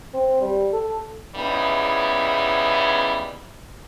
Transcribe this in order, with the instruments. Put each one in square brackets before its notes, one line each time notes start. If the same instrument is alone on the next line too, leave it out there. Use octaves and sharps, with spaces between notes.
[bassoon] C4
G3
A4
[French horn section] E2 G#2 C#3 G3 B3 E4